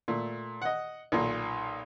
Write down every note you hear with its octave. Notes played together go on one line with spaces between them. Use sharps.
A#2 A3
D#5 F#5
B1 A#2